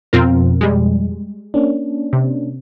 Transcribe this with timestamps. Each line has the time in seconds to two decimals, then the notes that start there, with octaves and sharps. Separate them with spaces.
0.13 F2 B2 F3 C4 F4 A#4
0.61 G3 G#3
1.54 A#3 C#4 D4
2.13 C3